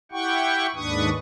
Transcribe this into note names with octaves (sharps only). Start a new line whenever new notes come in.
E4 G4 F#5 G5 C#6
D#2 G#2 D4 B4 C#6 D#6